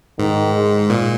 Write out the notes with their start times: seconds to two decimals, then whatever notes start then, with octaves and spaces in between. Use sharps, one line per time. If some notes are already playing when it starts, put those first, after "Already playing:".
0.18 G#2 D#3
0.55 G#3
0.90 A#2